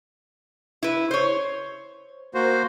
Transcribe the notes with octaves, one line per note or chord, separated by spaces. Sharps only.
E4 B4
C5 C#5
A#3 F#4 C5